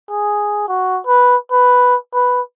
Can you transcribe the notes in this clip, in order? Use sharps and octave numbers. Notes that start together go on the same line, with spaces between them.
G#4
F#4
B4
B4
B4